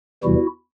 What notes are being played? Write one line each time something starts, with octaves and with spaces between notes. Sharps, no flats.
E2 C3 E3 G3 E4 F#4